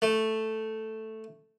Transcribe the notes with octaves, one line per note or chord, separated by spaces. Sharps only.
A3